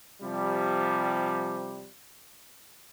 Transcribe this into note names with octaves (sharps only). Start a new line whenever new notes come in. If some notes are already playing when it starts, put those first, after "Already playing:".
C3 F3 G3